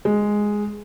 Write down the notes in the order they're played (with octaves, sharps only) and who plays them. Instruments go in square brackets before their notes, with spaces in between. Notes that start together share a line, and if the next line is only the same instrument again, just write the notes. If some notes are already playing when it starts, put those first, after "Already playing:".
[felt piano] G#3